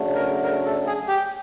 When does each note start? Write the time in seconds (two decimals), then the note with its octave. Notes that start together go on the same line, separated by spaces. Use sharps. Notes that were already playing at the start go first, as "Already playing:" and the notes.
Already playing: C#3 F#3 A3 D4
0.15 A#4
0.44 A#4
0.66 A4
0.87 G#4
1.08 G4